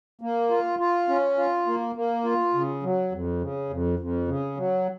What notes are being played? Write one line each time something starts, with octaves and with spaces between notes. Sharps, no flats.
A#3
F4
F4
C#4
F4
A#3
A#3
F4
C#3
F#3
F2
C#3
F2
F2
C#3
F#3